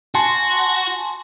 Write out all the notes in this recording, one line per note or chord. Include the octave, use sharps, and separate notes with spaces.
F#4 G#5 A5 C6